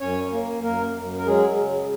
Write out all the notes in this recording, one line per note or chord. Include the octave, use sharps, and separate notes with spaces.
F#2 C#4 C#5
A#3
F#2 A#3 A#4
F#2
A#4
F#3 G#3 G#4
C#3